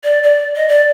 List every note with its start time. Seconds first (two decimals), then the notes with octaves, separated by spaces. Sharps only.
0.04 D5
0.23 D5
0.56 D#5
0.68 D5